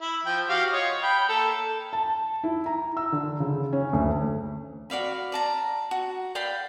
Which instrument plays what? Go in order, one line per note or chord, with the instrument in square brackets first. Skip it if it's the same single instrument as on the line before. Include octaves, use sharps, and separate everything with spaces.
[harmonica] E4
F3 G5
F#4 G4 F5
F4 C#5 D#5
G5 B5
A#3 A4
[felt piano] A5
E4
A#5
E6
D3
C#3
C#4
D2
[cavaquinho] F#4 D5 F5 B5
D5 A5 A#5
F#4
D5 F5 G5 B5